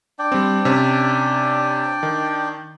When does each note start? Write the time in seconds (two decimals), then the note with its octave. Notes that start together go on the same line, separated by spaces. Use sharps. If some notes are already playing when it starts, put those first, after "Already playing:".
0.19 D4 D5 G5
0.32 G3 C4
0.65 C3 C#4
2.03 D#3